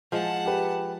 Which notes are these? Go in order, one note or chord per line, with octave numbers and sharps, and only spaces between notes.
F3 G#3 F#5 A5
G4 B4